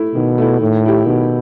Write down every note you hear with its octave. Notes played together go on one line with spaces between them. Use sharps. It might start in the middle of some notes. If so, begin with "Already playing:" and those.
Already playing: A3 E4
B2 D#3
A3 E4
A2 D#3
A3 E4 G4
B2 D#3